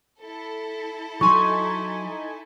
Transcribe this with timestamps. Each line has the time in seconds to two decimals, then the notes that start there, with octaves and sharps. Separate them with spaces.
0.20 E4 A4
1.21 F#3 D#4 G#5 C6 C#6